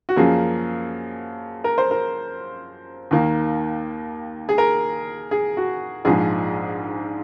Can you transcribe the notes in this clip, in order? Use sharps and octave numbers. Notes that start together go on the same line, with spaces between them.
F#4
F#2 F3 A#3 G#4
A#4
C5
A#4
D#2 D#3 A#3
G#4
A#4
G#4
F#4
A#1 G#2 F3 G#3 G#4